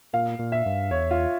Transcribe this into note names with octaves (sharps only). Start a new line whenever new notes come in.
A#2 F5
A#2
E5
G2
E2 C#5
F4